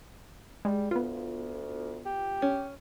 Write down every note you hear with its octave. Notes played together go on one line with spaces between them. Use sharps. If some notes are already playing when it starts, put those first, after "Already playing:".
G3 G#3
D2 B3 F4
G4
C#4